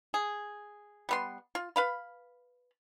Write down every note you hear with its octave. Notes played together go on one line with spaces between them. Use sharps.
G#4
G3 B3 C6
F4
B4 F5 B5